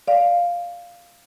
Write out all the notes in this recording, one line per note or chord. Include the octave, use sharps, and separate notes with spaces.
D5 F5